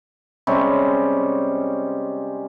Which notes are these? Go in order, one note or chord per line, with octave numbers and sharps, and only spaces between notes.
C3 G3 G#3 C#4